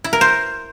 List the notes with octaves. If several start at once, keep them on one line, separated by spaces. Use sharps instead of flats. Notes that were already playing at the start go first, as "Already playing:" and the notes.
E4
A#4
C5